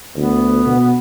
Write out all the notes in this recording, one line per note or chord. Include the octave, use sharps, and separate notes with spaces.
D2 B3
B2